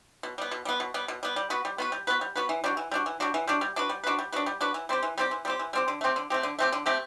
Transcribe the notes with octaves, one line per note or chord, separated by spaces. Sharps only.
B2
G3 B3
B2
G3 B3
B2
G3 B3
B2
G3 B3
G3
B3 F#4 B4
G3
B3 F#4 B4
G3
B3 F#4 B4
G3
B3 F#4 B4
E3
G3 D4 F#4
E3
G3 D4 F#4
E3
G3 D4 F#4
E3
G3 D4 F#4
G3
D4 F#4 B4
G3
D4 F#4 B4
G3
D4 F#4 B4
G3
D4 F#4 B4
E3
G3 C4 G4
E3
G3 C4 G4
E3
G3 C4 G4
E3
G3 C4 G4
D3
A3 C4 G4
D3
A3 C4 G4
D3
A3 C4 G4
D3
A3 C4 G4